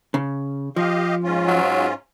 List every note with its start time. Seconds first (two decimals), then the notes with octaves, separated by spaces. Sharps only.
0.14 C#3
0.76 F3 G4 D#5 F5
1.24 G#2 C#4 F4
1.47 F#3